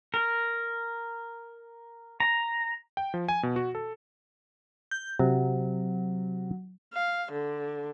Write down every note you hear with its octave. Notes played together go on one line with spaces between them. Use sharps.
A#4
A#5
G5
F3
G#5
B2
F#4
A4
G6
C3 F#3
F5
D3